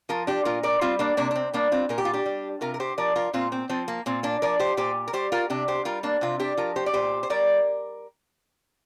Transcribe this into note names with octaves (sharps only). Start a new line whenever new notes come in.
F3 F4 A#4
D4 G4
A#2 F4 A#4
A#4 D5
G3 C4 F4
A#3 D4
C3 A#3 D4
D4
C4
G3 A#3 D4
C4 F4
A#2 A#4
G4
F4
D4 G4
G3
C3 F4 A#4
A#4
G4 C5
F3 A#4 D5
F4 A#4
A#2 C4 F4
C4
F3 C4
A#3
A#2 C4
A#3 D4
F3 A#4 D5
G4 C5
A#2 G4 C5
A#4
G3 G4 C5
F4 A#4
C3 D4 G4
G4 C5
G3 F4 A#4
A#3 D4
C3 C4 F4
D4 G4
F3 F4 A#4
G4 C5
D5
A#2 G4 C5
C5
G3 A#4 D5